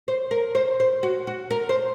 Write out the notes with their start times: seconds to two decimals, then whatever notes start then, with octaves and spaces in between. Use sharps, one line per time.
0.08 C5
0.31 A#4
0.55 C5
0.80 C5
1.03 F#4
1.27 F#4
1.51 A#4
1.69 C5